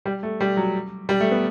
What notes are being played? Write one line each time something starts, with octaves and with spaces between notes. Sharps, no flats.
G3
A3
G3
F#3
G3
A3
B3